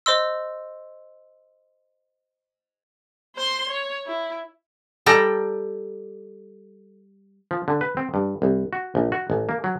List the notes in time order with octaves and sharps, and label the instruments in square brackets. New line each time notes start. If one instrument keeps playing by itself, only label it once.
[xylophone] C5 D#5 C6 E6
[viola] C5 C6
C#5
E4
[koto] G3 A4 G5 A#5
[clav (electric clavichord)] F3
D3
B4
C4
G2
C2
F#4
A#1
F#4
A1
A#3
F#3